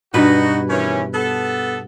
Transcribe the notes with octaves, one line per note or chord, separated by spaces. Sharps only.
G2 B2 D#4 F#4 B4
D#3 E3 C#4
B3 A4